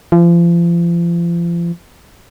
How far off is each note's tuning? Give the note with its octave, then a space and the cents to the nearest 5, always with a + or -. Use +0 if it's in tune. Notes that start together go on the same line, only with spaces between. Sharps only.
F3 -35